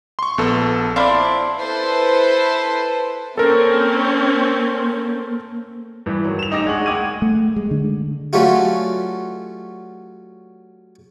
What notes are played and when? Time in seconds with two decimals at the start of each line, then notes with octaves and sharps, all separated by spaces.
0.19 C6 C#6
0.38 A#1 B3 A4
0.96 C4 D4 E4 D5 F5
1.57 E4 A4 B4 C5
3.38 A#3 C4 C#4 A4 A#4
6.06 G2 E3
6.25 D#3 F#3
6.39 E7 F7
6.51 A1 D#4 G4 D6 A#6
6.67 G#3 D4 F#5 C#6 F#7
6.86 F#1 F#5 G5 D6 G#6 D#7
7.22 A3
7.56 G#3
7.71 D3
8.33 F#3 G3 A3 C#4 F4 F#4